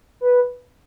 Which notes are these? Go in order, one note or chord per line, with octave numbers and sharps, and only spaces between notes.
B4